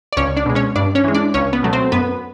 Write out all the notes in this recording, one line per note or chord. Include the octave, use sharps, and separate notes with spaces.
D5
C#2 C#4 C#5
D4 D5
B2 G#3
C#4 C#5
G2 D4 D5
C#4 C#5
E3 G#3
D4 D5
C#2 C#4 C#5
B3 B4
B2 F#3 A3
C4 C5
F#2 B3 B4